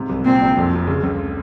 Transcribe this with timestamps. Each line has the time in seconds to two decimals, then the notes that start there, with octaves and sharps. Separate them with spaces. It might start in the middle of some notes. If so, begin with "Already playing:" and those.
Already playing: G#2 C3
0.09 C2
0.25 A#2 C4
0.41 A#1
0.57 F2
0.73 F1
0.87 C#3
1.03 C#2